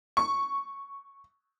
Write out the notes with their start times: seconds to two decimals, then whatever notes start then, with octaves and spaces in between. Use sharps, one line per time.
0.17 C#6